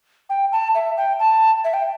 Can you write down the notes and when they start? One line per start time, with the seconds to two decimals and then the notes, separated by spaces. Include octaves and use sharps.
0.30 G5
0.52 A5
0.75 E5
0.97 G5
1.19 A5
1.64 E5
1.73 G5